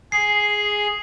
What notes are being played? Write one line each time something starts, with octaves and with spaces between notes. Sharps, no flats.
G#4 C7